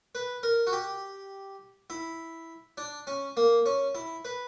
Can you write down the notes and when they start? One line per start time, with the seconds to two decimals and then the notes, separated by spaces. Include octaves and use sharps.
0.15 B4
0.43 A#4
0.67 F#4
0.72 G4
1.90 E4
2.77 D4
3.07 C#4
3.37 A#3
3.66 C#4
3.95 E4
4.25 B4